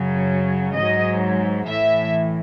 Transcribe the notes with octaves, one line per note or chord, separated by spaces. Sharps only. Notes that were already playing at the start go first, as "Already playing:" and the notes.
Already playing: F#2 C#3 F#3
G#2 F#3 D#5
A2 E3 E5